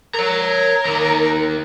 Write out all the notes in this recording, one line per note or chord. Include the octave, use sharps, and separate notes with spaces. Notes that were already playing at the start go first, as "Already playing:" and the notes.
A#4 C#5 A#5
D#2 A#5